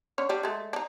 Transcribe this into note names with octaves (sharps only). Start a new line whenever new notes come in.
D3 C#4 C#5
G3 D4
G#3 A3
D4 D#4